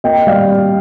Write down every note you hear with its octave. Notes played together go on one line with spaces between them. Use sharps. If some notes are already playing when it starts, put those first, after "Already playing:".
A#3 D#5 G5
G3 D5 F5